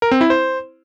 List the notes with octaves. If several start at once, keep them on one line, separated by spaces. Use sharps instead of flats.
A#4
C4
E4
C5